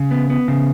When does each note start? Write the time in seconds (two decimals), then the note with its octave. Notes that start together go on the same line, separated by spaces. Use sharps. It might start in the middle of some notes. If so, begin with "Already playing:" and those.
Already playing: C#3
0.11 B3
0.30 B3
0.48 C#3